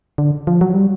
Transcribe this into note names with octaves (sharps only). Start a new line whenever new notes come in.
D3
F3
F#3
G3